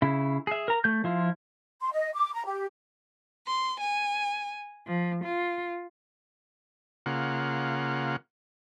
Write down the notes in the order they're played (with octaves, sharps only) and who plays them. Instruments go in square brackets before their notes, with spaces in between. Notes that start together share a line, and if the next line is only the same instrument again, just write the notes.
[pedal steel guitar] C#3 E4
G#4 E5
A#4 A#5
A3 G6
F3 E4 F4
[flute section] C6
D#5
D6
A#5
G4
[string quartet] C6
G#5
F3
F4
[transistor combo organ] C#3 A#3 F4 F#5